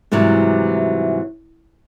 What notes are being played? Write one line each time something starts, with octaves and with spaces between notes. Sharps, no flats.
G#2 C3 E3 F#3 G3